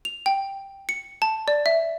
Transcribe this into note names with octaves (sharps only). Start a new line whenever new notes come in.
F7
G5
C#7
A5
D5
E5